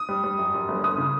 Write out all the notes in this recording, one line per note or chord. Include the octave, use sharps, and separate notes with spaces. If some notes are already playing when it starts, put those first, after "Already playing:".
Already playing: D#6
G3
G3
F#2
F#2
G1
G1 D#6
C#3